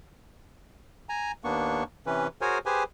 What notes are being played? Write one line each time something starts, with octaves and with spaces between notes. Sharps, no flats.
G#5 A#5
D#2 A#3 B3 D4 C#6
C3 E3 C#4 B4
F#4 G#4 A#4 C5 C#5 G#5
G4 G#4 B4 C5 G#5